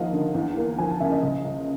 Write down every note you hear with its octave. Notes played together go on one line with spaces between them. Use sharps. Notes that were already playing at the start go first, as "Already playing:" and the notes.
Already playing: D#2 F3 A#3 D#5 F5 F#5
D3
E2
A#3
F3 G#5
A5
C#3 E5
D#5
C#2
C#2